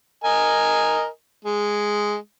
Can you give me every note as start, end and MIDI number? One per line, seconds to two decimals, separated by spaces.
0.24 1.07 70
0.24 1.07 75
0.24 1.07 80
1.45 2.17 56